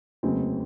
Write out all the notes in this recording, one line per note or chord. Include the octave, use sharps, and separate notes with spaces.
F1 D#2 C#3 F#3 C4